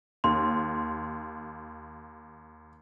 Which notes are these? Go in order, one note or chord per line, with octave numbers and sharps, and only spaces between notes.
D#2 C6